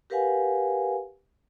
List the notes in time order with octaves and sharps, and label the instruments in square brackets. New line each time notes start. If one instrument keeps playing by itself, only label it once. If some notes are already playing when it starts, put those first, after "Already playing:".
[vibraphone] G4 A#4 B4 F5 F#5 G#5